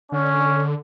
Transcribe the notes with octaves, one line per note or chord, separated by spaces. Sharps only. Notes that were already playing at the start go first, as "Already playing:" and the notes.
D3 C#4